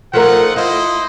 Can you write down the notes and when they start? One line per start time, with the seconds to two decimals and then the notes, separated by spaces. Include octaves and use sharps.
0.13 F3 A3 D#4 F4 A#4 F#5
0.56 E4 F4 C5 D#5